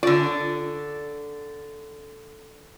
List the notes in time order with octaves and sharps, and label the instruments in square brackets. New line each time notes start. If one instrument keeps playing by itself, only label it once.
[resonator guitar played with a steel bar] D3 D5 [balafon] F4